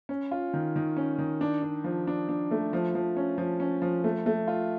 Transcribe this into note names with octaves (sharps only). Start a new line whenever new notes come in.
C#4
F4
D#3
D#3
C#4
D#3
D4
D4
F3
D4
D4
A3
F3
F3
C#4
F3
C#4
F3
A3
A3
F4